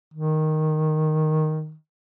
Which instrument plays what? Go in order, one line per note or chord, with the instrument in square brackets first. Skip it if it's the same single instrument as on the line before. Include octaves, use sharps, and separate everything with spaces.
[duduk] D#3